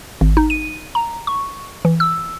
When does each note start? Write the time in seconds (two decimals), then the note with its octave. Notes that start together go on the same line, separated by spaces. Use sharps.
0.21 G#1
0.37 D#4
0.50 D#7
0.95 A#5
1.27 C#6
1.85 E3
2.00 E6